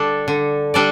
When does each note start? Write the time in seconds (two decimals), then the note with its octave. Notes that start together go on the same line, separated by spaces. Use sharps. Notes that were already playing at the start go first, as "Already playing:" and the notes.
Already playing: D3 G3 D4 A4 D5
0.28 D3
0.74 G3 D4 A4 D5